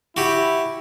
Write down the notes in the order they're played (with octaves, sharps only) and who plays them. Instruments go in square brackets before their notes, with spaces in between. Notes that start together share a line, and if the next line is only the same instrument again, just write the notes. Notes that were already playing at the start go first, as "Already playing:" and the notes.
[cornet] E4 [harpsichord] F#4 G4